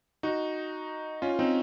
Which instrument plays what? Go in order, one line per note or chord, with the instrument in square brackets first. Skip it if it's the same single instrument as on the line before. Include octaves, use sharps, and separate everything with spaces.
[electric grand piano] D#4 F#4
C#4 F4
C4 D#4